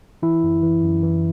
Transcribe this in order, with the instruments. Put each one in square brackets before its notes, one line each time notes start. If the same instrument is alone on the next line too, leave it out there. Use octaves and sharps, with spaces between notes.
[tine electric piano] E3 E4
F#2
E3
F#2
E3